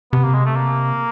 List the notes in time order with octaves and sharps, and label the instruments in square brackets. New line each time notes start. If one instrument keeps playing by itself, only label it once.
[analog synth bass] C3 [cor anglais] B3
[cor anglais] A#3
G#3
A3
A#3